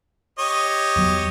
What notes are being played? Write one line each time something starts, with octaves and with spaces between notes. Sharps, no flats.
G4 C#5 D#5
E2 F#3